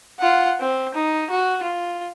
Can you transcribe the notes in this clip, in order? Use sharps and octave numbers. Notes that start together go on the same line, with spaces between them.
F4 F#5
C4
D#4
F#4
F4